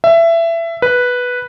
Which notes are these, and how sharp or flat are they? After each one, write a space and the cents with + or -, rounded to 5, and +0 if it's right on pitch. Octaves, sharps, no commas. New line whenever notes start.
E5 +20
B4 -5